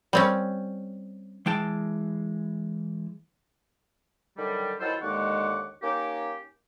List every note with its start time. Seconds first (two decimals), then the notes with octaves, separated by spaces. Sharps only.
0.13 G3 C4 C#4
1.46 E3 G#3 G5 A5
4.37 D3 D#3 F#3 G3
4.80 D#3 F#3 E4 F4 A4 C5
5.01 D#2 D3 G#3 F#5 C#6 D6
5.82 A#3 C#4 D#4 G4